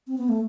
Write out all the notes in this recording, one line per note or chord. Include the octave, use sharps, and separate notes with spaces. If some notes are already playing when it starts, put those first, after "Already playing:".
C4
B3
A3